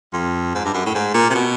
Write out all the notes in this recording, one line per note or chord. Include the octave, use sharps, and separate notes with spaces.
F2
G#2
G2
F#2
A2
G#2
A#2
C3
B2